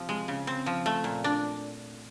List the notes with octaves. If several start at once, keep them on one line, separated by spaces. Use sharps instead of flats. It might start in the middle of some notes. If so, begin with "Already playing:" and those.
Already playing: C3 F3 C4
G#3
C#3
C4
F3
A3
A#2
D4